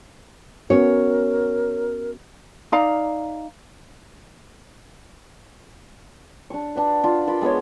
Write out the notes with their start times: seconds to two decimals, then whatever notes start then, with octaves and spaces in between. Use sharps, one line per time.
0.70 B3 C#4 F#4 A#4 C#5
2.72 D#4 D5 F5 A#5
6.50 D4 C#6
6.75 D4 F#4 B4
7.04 D4 F4
7.27 F4 A#4 B5
7.41 G#3 B3 F#4 C#5